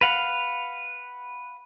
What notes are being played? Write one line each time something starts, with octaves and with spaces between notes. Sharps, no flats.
B4 F5 F#5